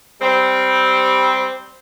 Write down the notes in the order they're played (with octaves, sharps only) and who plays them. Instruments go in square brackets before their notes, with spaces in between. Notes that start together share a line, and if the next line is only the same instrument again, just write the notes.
[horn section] G3 C4